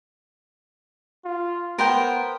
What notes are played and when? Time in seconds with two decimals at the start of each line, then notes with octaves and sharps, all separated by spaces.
1.25 F4
1.79 B3 A#4 C5 G5